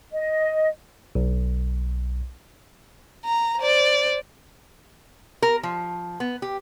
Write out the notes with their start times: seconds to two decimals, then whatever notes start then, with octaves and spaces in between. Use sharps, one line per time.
0.13 D#5
1.15 B1
3.25 A#5
3.60 C5 D5
5.42 A#4
5.63 F3
6.20 B3
6.42 G4